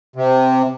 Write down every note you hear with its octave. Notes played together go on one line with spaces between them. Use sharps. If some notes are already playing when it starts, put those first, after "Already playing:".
C3